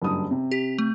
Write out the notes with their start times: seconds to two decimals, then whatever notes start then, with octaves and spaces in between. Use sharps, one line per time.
0.02 F#1 G2 D#6
0.31 C3
0.51 G4 B6
0.78 A3